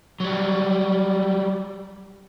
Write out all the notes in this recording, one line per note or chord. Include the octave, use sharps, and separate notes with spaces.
F#3 G3